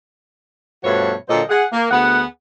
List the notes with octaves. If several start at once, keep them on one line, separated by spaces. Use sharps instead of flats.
G2 B2 F3 A3 F#4 C#5
A#2 D3 F#3 A4 C5 D#5
G#4 F#5
A#3
D2 B3 G#4 F#5